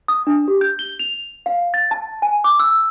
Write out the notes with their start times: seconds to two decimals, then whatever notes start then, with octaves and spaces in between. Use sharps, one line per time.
0.08 D#6
0.27 D4
0.48 G4
0.61 G6
0.79 G7
0.99 F7
1.46 F5
1.74 A6
1.91 A5
2.22 G#5
2.44 D6
2.60 E6